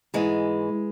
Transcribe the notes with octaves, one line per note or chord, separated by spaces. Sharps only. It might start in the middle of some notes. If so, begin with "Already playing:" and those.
G#2 E3 G#3